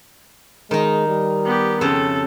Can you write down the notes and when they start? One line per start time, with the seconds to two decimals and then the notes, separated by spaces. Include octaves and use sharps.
0.71 D#3 G#3 D#4 A#4
1.08 G3
1.45 B3 G4
1.81 F2 C#3 G4 A4